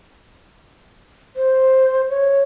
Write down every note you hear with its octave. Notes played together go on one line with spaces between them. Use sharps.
C5
C#5